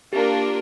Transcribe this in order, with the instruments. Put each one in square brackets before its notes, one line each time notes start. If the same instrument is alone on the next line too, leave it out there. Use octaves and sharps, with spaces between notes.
[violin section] A#3 D4 F4 A#4 [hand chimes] G4